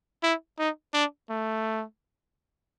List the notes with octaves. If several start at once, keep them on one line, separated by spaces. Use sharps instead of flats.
E4
D#4
D4
A3